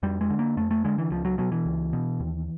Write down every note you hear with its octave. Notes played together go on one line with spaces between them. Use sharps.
F2 G3
G#3
D3
A#3
F2 A3
A3
D3 G#3
E3
C#2 F3
F#3
B2 F#3
E3
C#2
B2
D#2